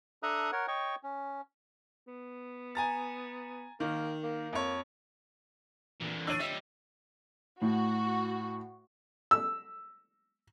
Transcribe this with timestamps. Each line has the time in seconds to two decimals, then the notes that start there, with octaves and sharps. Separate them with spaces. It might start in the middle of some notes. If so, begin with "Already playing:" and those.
0.23 D4 A4 E5 A#5 D#6 F#6
0.52 A#4 C#5 F#5
0.68 C#5 D#5 G5 C#6
1.03 C#4
2.08 B3
2.75 G#5 A#5 A6
3.80 D#3 A#3
4.23 A#3
4.53 F2 C#5
6.00 A#2 D3 E3
6.27 D4 C#5 E6 D#7
6.40 G3 F4 D#5 E5
7.62 A2 F#4
9.31 E6